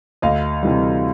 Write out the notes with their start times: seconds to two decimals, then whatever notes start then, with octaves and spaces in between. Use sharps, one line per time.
0.22 D2 D#5 F5
0.63 C3 E3 G3